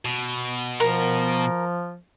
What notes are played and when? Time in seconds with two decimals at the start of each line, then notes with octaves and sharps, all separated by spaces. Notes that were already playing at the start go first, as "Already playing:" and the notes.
0.05 B2
0.80 F3 A#4